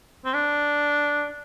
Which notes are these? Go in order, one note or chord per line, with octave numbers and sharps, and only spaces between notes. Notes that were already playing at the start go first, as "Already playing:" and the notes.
C4
D4